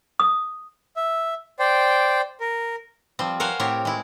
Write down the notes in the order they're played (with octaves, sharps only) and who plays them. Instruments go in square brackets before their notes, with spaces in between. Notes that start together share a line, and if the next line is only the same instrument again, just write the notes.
[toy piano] D#6
[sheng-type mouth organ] E5
C5 D5 G5
A#4
[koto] F3 G3 C4
A#4 C5 C#5 F5 F#5 G#5
A2 C4 G4 A#4 C#5
G#3 E4